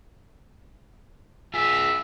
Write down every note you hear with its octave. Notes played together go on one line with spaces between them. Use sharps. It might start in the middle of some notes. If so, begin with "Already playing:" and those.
F4 G#4 E5